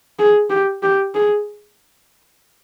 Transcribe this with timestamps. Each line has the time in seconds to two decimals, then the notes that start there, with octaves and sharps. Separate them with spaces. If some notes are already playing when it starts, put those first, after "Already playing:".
0.19 G#4
0.50 G4
0.83 G4
1.15 G#4